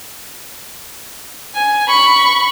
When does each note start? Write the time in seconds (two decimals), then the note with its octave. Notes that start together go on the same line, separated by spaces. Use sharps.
1.55 G#5
1.89 B5 C#6